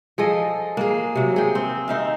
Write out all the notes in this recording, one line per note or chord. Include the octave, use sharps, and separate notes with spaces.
F3 G#4 A4 D#5
A#3 G#4
C3 F#3
G#4 G5
C4
C4 D#4 E5 F5